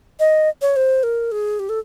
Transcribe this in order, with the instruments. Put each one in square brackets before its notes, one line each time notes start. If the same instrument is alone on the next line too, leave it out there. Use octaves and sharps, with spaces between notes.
[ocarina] D#5
C#5
C5
A#4
G#4
G4
A4